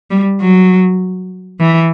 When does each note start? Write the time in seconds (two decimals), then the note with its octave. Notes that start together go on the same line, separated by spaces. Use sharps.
0.11 G3
0.41 F#3
1.60 E3